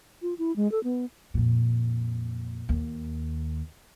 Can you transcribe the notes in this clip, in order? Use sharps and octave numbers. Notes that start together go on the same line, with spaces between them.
F4
E4
G#3
A4
B3
F2 A#2
D#2